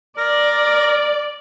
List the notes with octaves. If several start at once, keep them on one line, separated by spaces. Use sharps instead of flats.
A#4 D5